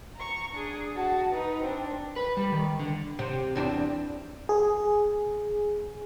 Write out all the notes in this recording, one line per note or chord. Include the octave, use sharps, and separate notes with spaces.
A#5 C#6
D4 G#4
F#4 A5
D#4 B4
C4 D4
B4
G3
D#3
D3
C3
E2 C4 D4
G#4